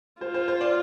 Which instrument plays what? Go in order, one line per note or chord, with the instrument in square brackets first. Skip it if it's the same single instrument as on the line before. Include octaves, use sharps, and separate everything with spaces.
[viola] F4 [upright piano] C5
[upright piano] C5
C5
D5